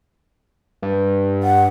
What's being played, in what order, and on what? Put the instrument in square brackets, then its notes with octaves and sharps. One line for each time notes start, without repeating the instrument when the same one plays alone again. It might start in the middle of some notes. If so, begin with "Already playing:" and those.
[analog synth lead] G2
[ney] F#5